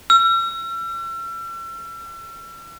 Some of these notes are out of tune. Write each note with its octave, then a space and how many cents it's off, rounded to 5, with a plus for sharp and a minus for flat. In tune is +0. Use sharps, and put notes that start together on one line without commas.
E6 +40